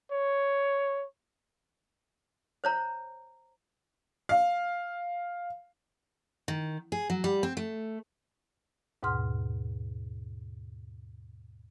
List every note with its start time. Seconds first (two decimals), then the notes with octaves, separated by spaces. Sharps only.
0.12 C#5
2.64 C5 C#5 A#5
4.29 F5
6.48 D#3
6.92 G#4
7.10 F#3
7.24 G3
7.43 C4
7.57 A3
9.03 D#2 G#2 B2 F#5 C6 F6